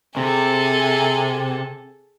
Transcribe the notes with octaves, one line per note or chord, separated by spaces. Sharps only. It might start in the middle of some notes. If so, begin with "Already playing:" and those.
C3 G#4 A4